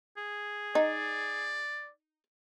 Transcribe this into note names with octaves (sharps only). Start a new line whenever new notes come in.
G#4
D#4 D5